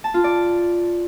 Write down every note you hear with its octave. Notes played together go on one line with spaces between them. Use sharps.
A5
F4
D5